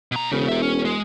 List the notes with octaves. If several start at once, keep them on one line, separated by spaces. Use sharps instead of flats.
B2 A#5
E1 C#3
G4 E5
C#4
G#3